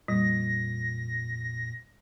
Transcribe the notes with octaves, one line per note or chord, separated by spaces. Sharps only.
F2 A#2 G3 A#6